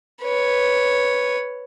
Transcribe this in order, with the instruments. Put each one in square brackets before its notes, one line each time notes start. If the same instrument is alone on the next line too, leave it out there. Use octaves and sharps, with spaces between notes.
[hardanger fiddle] B4 C#5